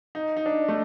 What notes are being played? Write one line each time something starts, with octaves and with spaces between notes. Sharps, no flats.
D#4
D#4
D4
A3